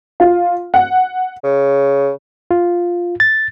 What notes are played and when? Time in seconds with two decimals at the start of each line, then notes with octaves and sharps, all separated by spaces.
0.20 F4
0.74 F#5
1.44 C#3
2.51 F4
3.20 A6